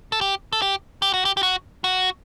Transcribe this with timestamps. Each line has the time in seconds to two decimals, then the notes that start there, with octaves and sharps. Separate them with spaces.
0.12 A4
0.21 G4
0.53 A4
0.62 G4
1.02 G4
1.14 F#4
1.25 G4
1.37 G4
1.43 F#4
1.84 F#4